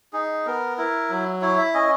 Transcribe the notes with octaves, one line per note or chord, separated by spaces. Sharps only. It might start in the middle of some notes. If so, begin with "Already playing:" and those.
D#4 G#4
B3 A#4
E4 A#4
F#3
E4 C#5
E5
C#4 D#5